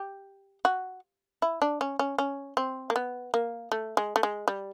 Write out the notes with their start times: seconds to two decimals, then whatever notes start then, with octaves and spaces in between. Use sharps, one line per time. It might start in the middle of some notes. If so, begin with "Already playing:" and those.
Already playing: G4
0.65 F#4
1.42 E4
1.62 D4
1.81 C#4
1.99 C#4
2.18 C#4
2.57 C4
2.90 A#3
2.96 B3
3.34 A#3
3.72 A3
3.97 G#3
4.16 A3
4.23 G#3
4.48 G3